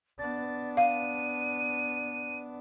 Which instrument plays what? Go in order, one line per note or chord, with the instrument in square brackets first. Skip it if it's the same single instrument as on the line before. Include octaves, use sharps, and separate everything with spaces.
[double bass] B3 D4 [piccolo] A6
[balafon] F5 [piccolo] D#7